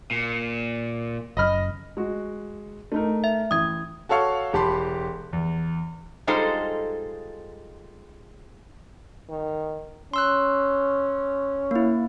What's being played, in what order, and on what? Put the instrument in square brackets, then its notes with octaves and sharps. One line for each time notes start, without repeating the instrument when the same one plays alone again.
[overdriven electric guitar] A#2
[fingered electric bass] F#1 F#2 [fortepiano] D#5 B5 F6
[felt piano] G#3 F#4
A3 D#4 A#4
[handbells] E5
[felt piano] A1 [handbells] D#6 G#6
[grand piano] F#4 A4 C#5 F5 C#6
E1 G4 A5 B5 C6
E2
[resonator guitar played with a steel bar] G3 G#3 D#4 F4 A4 C5
[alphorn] D#3
[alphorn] C#4 [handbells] C6 E6 F#6
[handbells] A#3 E4